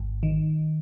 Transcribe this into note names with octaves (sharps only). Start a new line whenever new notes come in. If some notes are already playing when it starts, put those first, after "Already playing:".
Already playing: G#1
D#3